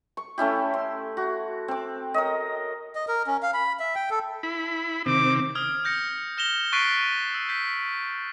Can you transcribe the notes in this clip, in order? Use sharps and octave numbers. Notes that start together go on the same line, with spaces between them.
C#6
A3 C#4 E4 G4
C6
F#4
C4 D6
A#4 C#5 D#5
D#5
A#4
C#4
F5
B5
E5
G5
A4
E4 B5
C3 D#3 C4 D6
D#6 F6 G#6
D#6 G6 A#6 C#7
F6 A#6 E7 F7 G7
C#6 F#6 A6 B6 C7 D7
E6
G6 B6